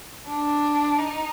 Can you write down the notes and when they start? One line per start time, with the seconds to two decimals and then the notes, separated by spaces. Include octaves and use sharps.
0.27 D4
0.99 D#4